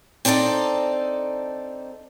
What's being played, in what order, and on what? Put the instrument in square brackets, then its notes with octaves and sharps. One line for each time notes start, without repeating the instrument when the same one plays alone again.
[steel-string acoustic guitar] C4 D4 D#4 A4 D5